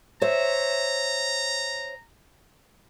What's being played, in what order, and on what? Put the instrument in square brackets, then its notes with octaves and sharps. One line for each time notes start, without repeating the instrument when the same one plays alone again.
[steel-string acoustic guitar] C5 C#5 E5 [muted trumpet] A#5